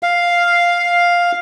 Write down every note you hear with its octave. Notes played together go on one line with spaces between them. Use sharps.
F5